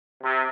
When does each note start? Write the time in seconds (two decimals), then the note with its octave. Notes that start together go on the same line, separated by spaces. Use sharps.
0.22 C3